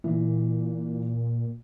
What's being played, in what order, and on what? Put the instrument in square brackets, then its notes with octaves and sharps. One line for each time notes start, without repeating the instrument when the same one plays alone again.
[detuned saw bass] A#2 [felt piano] E3